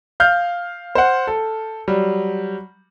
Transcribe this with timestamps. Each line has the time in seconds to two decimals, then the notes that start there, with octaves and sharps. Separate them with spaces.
0.20 F5 F6 G6
0.95 C5 F#5
1.27 A4
1.88 F#3 G3